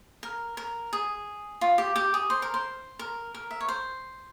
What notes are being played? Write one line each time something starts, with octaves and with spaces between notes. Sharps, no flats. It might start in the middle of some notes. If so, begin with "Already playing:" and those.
A#4
A#4
G#4
F4
G4
G4
G#4
C5
A#4
C5
A#4
A#4
E5
C#5
C5